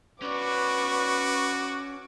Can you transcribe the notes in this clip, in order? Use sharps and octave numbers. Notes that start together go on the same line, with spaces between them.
C#4 F#4 B4 D5 C#6 D6